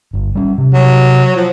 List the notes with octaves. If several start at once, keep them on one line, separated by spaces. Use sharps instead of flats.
G1
G3 C#4
C3
F#3
F3